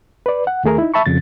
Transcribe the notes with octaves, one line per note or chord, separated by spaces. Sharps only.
B4 D5
F#5
D#2 D#3 A3 G#4 A#4
D#4 E4
E5 A5 B5 C#6
F2 C#3 A6